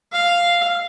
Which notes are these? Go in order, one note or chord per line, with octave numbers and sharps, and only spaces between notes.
F5